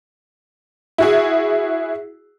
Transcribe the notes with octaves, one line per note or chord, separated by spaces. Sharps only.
E4 F#4 G#4